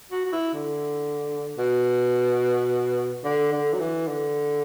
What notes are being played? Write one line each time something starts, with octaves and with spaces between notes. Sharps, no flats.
F#4
F#4
E4
D3
B2
D3
D3
F#3
E3
D3